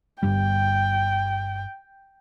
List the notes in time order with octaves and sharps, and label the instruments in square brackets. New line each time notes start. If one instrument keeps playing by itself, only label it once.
[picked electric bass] G1 G2 G3 [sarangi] G5